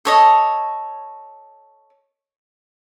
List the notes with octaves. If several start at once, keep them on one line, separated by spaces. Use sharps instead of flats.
A4 C#5 D#5